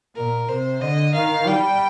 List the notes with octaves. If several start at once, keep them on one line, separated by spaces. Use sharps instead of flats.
A#2 A#4
C3 C5
D3 D#5
D#3 F5
G3 G5